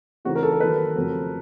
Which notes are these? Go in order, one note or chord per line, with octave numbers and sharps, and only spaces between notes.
C#3 E3 A3 C4 D#4 F#4
A#4
A4
A#4
D#3 F#3 A#3 B4
F2 C#3 F#3 A3 C4